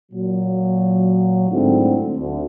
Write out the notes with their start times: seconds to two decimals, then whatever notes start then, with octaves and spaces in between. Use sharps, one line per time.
0.12 A#2 F#3
1.50 G#2 D3 A3 C4 E4 F#4
2.16 D2